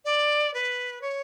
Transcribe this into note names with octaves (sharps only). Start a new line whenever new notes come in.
D5
B4
C#5